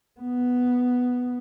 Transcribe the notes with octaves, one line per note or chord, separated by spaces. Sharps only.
B3